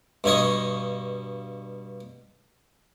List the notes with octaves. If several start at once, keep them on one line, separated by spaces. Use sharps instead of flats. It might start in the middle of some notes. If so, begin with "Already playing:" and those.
G2 B2 C#5 D#5